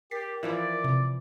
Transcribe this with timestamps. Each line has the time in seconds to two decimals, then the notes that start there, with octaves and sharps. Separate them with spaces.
0.11 G4 A#4 A6 B6 C7
0.43 E3 F3 E4 D5
0.84 C3